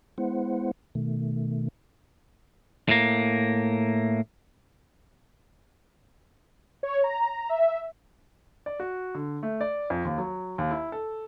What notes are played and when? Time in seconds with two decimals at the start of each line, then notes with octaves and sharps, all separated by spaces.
0.18 G#3 B3 E4 C5 F#5
0.95 B2 D#3 A3
2.89 A2 A#3
6.83 C#5
7.04 A#5
7.49 E5
8.66 D5
8.80 F#4
9.15 D3
9.43 A3
9.61 D5
9.90 F2
10.05 D#2
10.18 F#3
10.58 D#2
10.71 E4
10.92 A4